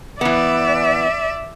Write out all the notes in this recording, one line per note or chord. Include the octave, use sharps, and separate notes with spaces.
E3 B3 D5 E5